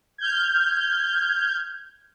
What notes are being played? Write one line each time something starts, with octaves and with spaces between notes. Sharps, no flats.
F6 G6 G#6